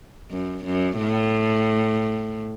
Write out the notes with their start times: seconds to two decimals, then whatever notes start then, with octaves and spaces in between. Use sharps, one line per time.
0.31 F#2
0.65 F#2
0.98 A2